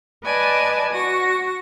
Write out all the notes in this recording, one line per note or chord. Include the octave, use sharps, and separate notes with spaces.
B4 D5 D#5 G#5 A5
F#4 C#6 A#6